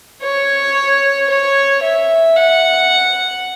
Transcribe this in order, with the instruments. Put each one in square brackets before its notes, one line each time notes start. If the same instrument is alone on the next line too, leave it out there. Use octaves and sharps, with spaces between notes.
[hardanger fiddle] C#5
C#5
E5
F#5